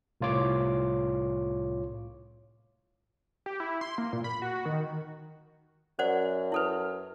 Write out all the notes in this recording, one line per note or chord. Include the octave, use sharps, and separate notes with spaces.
C2 A2 F4 C#5 D6
G4
E4
C6
A#3
A#2
B5
F#4
D#3
F#2 C5 D5 F#5
E4 A4 B4